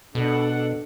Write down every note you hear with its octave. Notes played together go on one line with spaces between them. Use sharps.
B2 D4 A4 F#5